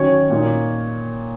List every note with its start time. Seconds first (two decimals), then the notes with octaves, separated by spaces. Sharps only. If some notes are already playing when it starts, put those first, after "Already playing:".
Already playing: D#3 F#3 C#4 C#5
0.30 A#2 A#3 D#4